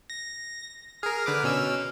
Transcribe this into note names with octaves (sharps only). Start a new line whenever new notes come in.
A#6
G#4 A#4 F6
D3 B4 D6
B2 C#4 E6